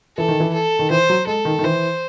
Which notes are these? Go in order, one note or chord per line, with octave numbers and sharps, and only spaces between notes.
E3 A4
D#3
E3
A4
D#3
E3 C5
F#3
G#3 A4
D#3
D#3
E3 C5